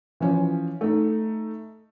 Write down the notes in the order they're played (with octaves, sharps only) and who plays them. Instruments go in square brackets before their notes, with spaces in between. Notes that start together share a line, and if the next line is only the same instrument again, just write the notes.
[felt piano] E3 F3 C#4
A3 D#4